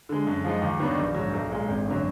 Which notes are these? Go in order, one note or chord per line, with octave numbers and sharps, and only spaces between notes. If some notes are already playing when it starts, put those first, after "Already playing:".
D3 G#3
F#2
F3 G#3 D#4
D#2
D#3 F#3 B3 D4
A#1
G#2 F#3
B1
A#2 G#3
G#1
F#2 D3 F#3